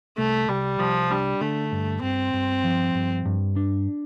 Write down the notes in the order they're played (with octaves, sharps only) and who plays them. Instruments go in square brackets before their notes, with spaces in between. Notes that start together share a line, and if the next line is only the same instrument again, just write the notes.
[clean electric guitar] C2 [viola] A3
[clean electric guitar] C2 [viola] G3
[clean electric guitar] C2 [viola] F3
[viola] G3 [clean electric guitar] D4
[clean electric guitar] D3 [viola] A3
[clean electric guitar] G2
[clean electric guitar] G2 [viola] C4
[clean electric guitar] G2
F3
G2
G2
D4